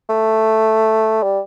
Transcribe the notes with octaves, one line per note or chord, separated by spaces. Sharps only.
A3
G3